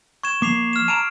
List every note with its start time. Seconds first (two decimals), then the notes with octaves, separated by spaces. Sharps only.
0.23 C#6 G#6 E7
0.42 F3 A#3 D6 C7 F7
0.73 F6 E7
0.88 A5 A#5 D7 D#7